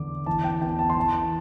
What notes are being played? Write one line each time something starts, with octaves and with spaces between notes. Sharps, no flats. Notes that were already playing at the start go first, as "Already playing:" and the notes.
Already playing: E2 D3 D6
E3 A5
G5
E2 G5
A5
C6
E3 A5